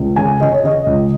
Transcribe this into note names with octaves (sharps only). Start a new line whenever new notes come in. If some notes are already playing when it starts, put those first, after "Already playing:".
Already playing: C#2
C#3 G#5
C#3 D#5
C#5
C#3 D#5
C#2